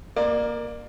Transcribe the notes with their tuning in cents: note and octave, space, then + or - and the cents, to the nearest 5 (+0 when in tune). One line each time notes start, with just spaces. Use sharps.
A#3 +10 D5 +30